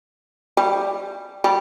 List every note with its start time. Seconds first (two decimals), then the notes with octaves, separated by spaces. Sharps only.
0.57 G3
1.44 G3